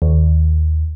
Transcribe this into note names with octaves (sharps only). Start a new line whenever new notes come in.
D#2